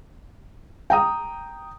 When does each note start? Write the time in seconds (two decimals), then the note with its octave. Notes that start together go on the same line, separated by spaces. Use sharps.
0.90 G5 A#5 D#6